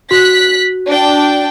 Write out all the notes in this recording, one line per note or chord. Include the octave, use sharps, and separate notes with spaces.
F#4 F#6 B6
D4 G5